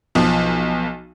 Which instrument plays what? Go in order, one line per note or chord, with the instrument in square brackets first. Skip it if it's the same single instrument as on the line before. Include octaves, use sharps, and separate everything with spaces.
[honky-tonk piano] B1 F3